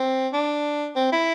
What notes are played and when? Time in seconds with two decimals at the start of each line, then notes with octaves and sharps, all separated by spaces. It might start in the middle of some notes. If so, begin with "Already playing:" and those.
Already playing: C4
0.33 D4
0.96 C4
1.12 E4